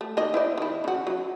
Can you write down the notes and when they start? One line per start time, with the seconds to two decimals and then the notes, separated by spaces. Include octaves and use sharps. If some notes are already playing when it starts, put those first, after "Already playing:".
0.01 A3
0.17 D#3 A#3 D#5
0.34 E4 C5 D5
0.58 D#3 E4
0.84 C#3 F#4
1.07 F#3